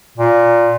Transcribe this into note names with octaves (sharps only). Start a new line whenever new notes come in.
A#2